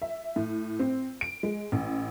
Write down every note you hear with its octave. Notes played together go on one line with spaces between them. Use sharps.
E5
A2
C4
D7
G#3
A1